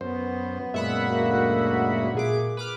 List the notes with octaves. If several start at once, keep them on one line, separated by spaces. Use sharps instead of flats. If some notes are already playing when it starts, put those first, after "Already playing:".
F#2 B3 C5
F#2 A#2 G#3 E5 F#5 B5
D2 A#3 F#4
A#2 G#4 D6
B4 D6 F6